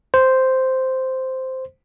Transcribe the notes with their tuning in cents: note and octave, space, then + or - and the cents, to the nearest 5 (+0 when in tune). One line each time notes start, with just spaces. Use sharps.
C5 -5